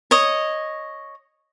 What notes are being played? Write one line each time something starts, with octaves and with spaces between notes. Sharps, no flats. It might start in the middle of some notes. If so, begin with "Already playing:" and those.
C#5 D#5